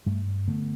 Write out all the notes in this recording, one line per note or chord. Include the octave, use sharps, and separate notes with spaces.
G2 G3 A3
D3 A3 B3